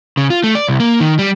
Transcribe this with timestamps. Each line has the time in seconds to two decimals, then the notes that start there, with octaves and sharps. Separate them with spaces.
0.17 C#3
0.30 F4
0.44 A3
0.55 D5
0.68 C2
0.80 A#3
1.00 D#3
1.19 G3